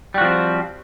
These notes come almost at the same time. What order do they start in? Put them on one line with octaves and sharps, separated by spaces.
G3 F#4 F3 C4